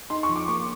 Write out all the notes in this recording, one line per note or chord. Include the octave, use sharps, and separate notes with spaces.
D#4 C6
C#6
F3
D6
A#3 C#6